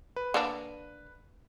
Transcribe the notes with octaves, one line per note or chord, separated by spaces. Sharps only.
B4
D3 A#3 D4